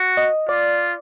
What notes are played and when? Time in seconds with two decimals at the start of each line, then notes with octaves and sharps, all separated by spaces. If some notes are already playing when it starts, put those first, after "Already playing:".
Already playing: F#4
0.17 D#5
0.49 F4 D5